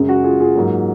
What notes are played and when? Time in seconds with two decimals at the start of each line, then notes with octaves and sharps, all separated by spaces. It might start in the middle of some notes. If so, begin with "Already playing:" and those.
Already playing: F#2 C#3 G#3
0.09 F#4
0.24 F4 G#4
0.40 F4 G#4
0.55 G#2 F#3 A#3